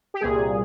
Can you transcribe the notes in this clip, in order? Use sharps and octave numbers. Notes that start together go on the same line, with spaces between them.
G4
C2 A#2 G3 G#4